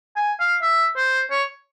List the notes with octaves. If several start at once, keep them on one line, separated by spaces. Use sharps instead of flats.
G#5
F5
E5
C5
C#5